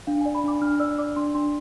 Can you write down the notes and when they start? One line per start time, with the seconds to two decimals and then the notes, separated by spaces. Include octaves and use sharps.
0.07 D4 F5
0.21 D5 G#5
0.35 B5
0.44 D4 D6
0.62 D4 F6
0.80 D5 E6
0.98 D5 D6
1.16 D4 C6
1.35 D4 C6